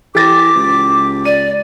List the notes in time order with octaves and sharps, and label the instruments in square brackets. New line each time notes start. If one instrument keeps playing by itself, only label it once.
[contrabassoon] E3 [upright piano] G4 A6 A#6 [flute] D6
[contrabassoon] C#2
[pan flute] D5 [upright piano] D#7